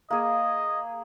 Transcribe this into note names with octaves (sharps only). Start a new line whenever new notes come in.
A#3 G#4 D#5